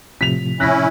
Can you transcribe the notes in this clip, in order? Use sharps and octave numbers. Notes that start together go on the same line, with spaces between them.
A2 C3 F3 B6 F7
C#4 E4 F#6 A#6 B6